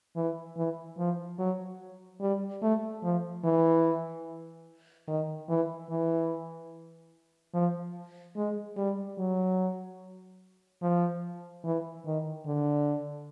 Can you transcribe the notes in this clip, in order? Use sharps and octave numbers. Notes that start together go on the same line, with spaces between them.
E3
E3
F3
F#3
G3
A3
F3
E3
D#3
E3
E3
F3
G#3
G3
F#3
F3
E3
D#3
D3